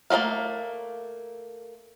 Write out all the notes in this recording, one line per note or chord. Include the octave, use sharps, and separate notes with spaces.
A3 A#3 C4 F#4 F5